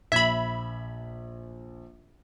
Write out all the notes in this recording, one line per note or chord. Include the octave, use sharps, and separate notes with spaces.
A#1 E5 B5 G#6